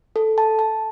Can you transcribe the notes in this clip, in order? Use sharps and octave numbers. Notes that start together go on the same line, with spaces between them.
A4
A5
A5